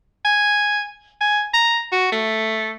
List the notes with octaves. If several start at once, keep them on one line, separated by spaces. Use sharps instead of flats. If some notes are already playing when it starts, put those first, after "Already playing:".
G#5
G#5
A#5
F#4
A3